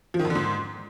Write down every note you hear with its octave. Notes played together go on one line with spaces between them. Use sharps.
F3
D#3
F2
D3
G#2